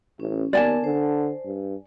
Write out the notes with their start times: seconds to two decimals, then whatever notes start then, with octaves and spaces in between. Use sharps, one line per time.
0.20 A1 C#4
0.53 D#2 B3 A#4 D5 G#5 A5
0.84 D3 C5
1.46 G2